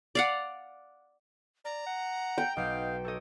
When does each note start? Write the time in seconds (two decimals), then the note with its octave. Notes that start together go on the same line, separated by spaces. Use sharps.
0.15 D5 F5 F#5
1.65 D5 A#5
1.86 F#5
2.38 G5
2.57 B1 D#5 F5
3.05 A4 C#5 D#5